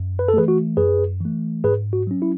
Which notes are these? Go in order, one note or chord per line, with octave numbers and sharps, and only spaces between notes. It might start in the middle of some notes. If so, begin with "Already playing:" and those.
Already playing: F#2
B4
A4
E3 A3 G#4 B4
F#4
F#2 G#4 B4
E3 A3
G#2 G#4 B4
F#4
F#3 C#4
E4